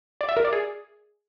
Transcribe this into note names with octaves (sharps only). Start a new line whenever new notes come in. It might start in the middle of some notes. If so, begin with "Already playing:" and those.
D5
E5
A#4
D5
G#4